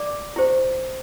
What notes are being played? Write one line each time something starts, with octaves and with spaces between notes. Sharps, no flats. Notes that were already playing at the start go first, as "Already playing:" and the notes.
Already playing: D5 D6
E4 G4 C5